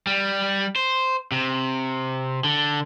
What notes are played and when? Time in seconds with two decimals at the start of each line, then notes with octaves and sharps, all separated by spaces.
0.07 G3
0.76 C5
1.32 C3
2.44 D3